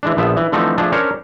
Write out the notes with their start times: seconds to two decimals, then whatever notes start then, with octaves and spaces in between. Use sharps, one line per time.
0.03 E3 G#3 D4
0.17 A#1 F3 B3 E5
0.37 E3
0.52 D3 E3 F3 A3 C4 D#4
0.78 F3 A3 D4 G#4
0.92 C#4 D4 A#4 C5 C#5